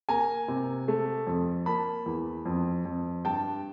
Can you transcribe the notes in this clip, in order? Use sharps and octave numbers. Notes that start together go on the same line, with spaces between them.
A#3 G#5 A#5
C3
A3
F2
A#3 A5 B5
E2
F2
F2
G2 G5 A5